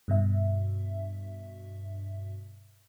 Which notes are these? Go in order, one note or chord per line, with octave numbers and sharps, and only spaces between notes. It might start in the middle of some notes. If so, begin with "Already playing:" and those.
G2 B2 E5